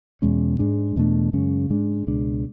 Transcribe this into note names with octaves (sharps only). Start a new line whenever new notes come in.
E2 B2 G#3 C#4
G#2 G#3 D4
E2 B2 A3 D4
F#2 C#3 G#3 C#4
G#2 G#3 D4
C#2 B2 G#3 D4